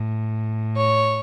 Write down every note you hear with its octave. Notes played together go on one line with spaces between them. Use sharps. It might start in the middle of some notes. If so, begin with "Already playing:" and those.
Already playing: A2
C#5